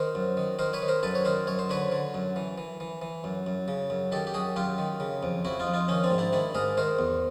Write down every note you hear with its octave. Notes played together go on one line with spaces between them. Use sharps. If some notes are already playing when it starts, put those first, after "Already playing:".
Already playing: D#3 A#4 C5
F#2
D#3
D#3 A#4 C5
B4 C#5
D#3
A#4 C5
F#2 A4 B4
C#5
D#3 A#4 C5
F#2 C#5
C5
D3 B4 C#5
D3
F#2
E3
E3
E3
E3
F#2
F#2
C#3
F#2
D#3 G4 A4
G4
F#2 F#4 G#4
F#2 F4 G4
D#3
C#3
F2
F2 E4 F#4
D#4 F4
F2
D#4 F4
D#3 C#4 D#4
C4 D4
G#2
D4 E4
D#3 D4 E4
G#2 G#4 A#4
D#3 A#4 C5
E2